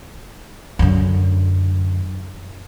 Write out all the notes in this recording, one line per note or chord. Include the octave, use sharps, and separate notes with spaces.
F#2 D3